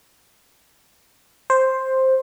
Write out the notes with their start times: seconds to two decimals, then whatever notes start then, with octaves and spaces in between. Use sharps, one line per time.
1.50 C5